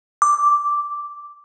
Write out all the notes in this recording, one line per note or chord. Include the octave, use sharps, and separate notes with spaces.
D6